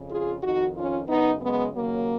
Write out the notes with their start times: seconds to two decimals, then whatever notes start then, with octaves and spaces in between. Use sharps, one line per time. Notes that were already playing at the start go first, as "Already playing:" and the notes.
Already playing: F2 C#3
0.09 F4 G#4
0.41 F2 D#3 D#4 F#4
0.75 C#4 F4
1.08 F#2 C#3 B3 D#4
1.42 G#3 B3
1.75 D#2 C#3 F#3 A#3